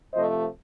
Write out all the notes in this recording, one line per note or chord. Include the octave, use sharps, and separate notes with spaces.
C3 F3 A3 C5 D#5